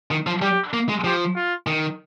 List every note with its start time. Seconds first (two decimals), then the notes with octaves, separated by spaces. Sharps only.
0.11 D#3
0.27 F3
0.42 G3 G4
0.73 A#3
0.89 G#3
1.04 F3 G4
1.36 F4
1.67 D#3